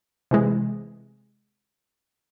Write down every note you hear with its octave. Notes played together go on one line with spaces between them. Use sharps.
C3 E3 G#3